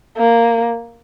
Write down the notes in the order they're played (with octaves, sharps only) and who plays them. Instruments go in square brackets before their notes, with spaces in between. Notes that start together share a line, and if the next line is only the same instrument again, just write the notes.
[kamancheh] A#3